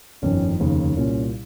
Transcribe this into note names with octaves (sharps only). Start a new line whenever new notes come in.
G1 F2 D#3 C#4
F1 D#2 C#3
C2 A#2 C#4